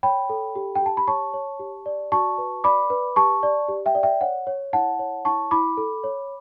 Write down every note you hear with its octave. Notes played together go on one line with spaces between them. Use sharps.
C#5 G5 B5
A4
G4
G5
G4 A5
B5
C#5 A5 C#6
C#5
G4
D5
F#4 A5 C#6
B4
D5 B5 D6
B4
G4 A5 C#6
D5
G4
E5 G5
D5
E5 G5
C#5 F#5
C#5
E4 F#5 A5
C#5
E4 A5 C#6
E4 B5 D6
A4
C#5